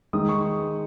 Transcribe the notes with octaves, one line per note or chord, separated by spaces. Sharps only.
D#3 G#3 D#4 D#6
C#6